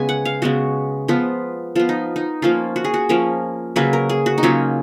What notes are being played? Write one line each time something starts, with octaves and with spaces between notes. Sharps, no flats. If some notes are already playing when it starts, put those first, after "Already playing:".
Already playing: C#3 G#3 B3 G#5
F#5
F5
C#3 G#3 B3 F#4
F3 B3 F4
F3 B3 F4
D#4
D#4
F3 A#3 C#4 F4
F#4
G#4
F#4
F3 A#3 C#4 A#4
C#3 F#3 A#3 C#4 B4
A#4
G#4
F#4
D#4
C#3 F#3 A#3 C#4 F4